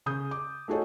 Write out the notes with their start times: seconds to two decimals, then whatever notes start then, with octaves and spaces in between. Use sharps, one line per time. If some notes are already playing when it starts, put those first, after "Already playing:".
0.06 C#3 D#6 G6
0.31 D6
0.68 A3 D#4 F#4 G#4 A4 C#5